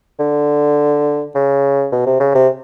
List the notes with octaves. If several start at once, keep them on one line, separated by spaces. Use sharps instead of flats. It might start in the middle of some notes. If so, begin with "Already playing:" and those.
D3
C#3
B2
C3
C#3
C3